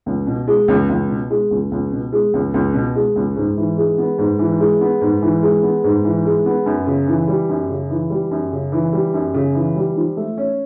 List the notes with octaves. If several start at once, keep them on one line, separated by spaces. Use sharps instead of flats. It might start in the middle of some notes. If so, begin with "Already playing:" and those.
C#2
B2
G#3
C#2
C#2
B2
G#3
C#2
C#2
B2
G#3
C#2
C#2
B2
G#3
C#2
G#2
E3
G#3
B3
G#2
E3
G#3
B3
G#2
E3
G#3
B3
G#2
E3
G#3
B3
F#2
C#3
E3
G3
F#2
C#3
E3
G3
F#2
C#3
E3
G3
F#2
C#3
E3
G3
F3
A3
C#4